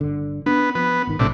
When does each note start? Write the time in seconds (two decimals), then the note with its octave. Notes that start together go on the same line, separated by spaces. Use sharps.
0.01 G1 D3
0.46 B3 D4
0.75 F3 B3
1.07 G#1 D#3
1.19 A#1 A2 C3 D4